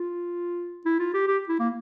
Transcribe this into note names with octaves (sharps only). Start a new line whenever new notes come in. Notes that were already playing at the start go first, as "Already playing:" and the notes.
Already playing: F4
E4
F4
G4
G4
E4
A#3